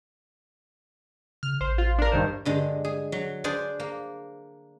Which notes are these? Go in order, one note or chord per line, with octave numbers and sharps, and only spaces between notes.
C#3 F6
A1 C5
F4
D4 A#4
G2 D#3 C5
G2 D3 G#3
G#4
F#3
D4 G#4 C5 D5
A#3